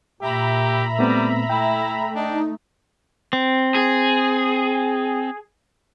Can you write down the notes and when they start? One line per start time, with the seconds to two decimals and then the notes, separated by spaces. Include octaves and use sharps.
0.22 A#2 G4 E5 A#5 B5
0.99 G3 A3 B3 C4
1.50 A3 E4 G5
2.15 D4 D#4
3.33 C4
3.75 G#4